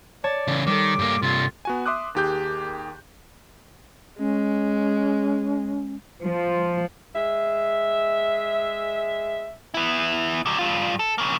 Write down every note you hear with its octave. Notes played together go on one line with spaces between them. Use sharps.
C#5 D5 A5
C#3 E3
D#3 G3 A4 D6
G2 A#3
G2 C3 F4
B3 F#4 G#5
E5 C6 D6 D#6 F#6
D#2 D#3 G4 G#4 G6
G#3 C#4
F3
G#3 E5
B3 E4
D3 F#3
G2 F4
A4
C#3 A#3